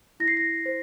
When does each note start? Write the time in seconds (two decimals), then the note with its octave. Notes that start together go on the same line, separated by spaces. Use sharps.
0.20 E4 A#6
0.28 C7
0.37 A#6
0.66 C5